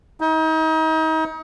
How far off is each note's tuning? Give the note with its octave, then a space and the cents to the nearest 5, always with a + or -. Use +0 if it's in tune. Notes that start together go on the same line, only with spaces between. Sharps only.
D#4 +35